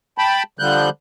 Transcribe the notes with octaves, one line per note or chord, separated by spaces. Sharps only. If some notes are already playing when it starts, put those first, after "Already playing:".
G5 A5 B5
D3 F3 G3 F#6 G6